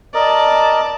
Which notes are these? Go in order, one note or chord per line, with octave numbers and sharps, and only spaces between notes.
A#4 D5 D#5 A5